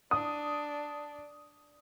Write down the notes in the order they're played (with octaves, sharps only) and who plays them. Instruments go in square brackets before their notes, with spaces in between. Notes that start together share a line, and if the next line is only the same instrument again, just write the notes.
[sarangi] D4 [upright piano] D#6